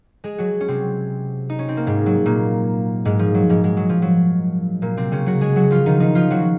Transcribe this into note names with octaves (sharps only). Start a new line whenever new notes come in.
G#3 G#4
F#3 F#4
C#4
C3 C4
D#4
C#4
C4
A#3
G#2 G#3
F#3
A#2 A#3
G#2 G#3
F3
F#3
G#2 G#3
G#3
F#3
F3
F#3
A#2 A#3
C3 C4
C#3 C#4
F#3 F#4
G#3 G#4
F#3 F#4
F3 F4
D#3 D#4
D#3 D#4
F3 F4
F#3 F#4